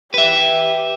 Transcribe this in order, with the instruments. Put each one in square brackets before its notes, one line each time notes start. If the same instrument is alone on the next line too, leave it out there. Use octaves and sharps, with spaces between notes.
[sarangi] G4 [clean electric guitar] B4 E5